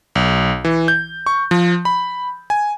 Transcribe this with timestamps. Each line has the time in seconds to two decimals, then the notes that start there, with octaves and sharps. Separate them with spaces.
0.15 B1
0.65 E3
0.88 G6
1.26 C#6
1.51 F3
1.85 B5
2.50 G#5